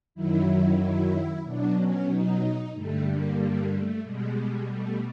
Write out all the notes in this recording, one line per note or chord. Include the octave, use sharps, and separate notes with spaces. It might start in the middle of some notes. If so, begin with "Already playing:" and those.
F#2 D#3 F#3 E4
E4
B2 F#3 D4
C#4
D#4
G2 D3 G3 A3
A#3
A#3
A3
B2 G3 G#3
A3